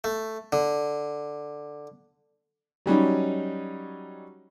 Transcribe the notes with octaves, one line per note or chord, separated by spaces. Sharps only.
A3
D3
F#3 G3 C#4 D#4